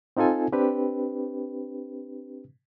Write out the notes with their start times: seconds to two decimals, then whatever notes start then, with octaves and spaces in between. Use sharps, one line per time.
0.17 C4 D#4 F4 A4 G#5
0.53 C4 D4 G4 B4